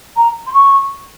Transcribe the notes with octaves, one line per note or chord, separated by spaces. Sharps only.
A#5
C6
C#6